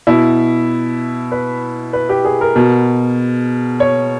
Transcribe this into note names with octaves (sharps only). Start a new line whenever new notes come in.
B2 E4
B4
B4
G4
G#4
A#4
B2
C#5